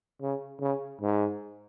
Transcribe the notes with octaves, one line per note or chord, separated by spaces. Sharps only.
C#3
C#3
G#2